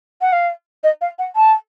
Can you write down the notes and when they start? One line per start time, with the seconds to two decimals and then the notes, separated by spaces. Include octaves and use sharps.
0.21 F#5
0.32 F5
0.83 D#5
1.01 F5
1.19 F#5
1.36 A5